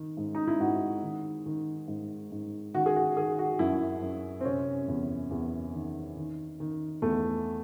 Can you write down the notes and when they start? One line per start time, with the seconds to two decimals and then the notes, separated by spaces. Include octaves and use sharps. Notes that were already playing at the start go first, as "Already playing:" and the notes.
Already playing: D#3
0.17 G#2
0.35 D#4
0.47 E4
0.60 G#2 F#4
1.02 D#3
1.46 D#3
1.88 G#2
2.32 G#2
2.74 D#3 F#4
2.86 G#4
2.96 F#4
3.16 D#3 G#4
3.39 F#4
3.59 F#2 E4
4.02 F#2
4.41 C4
4.45 C3 C#4
4.88 E2
5.31 E2
5.73 D#3
6.16 D#3
6.60 D#3
7.02 E2 A3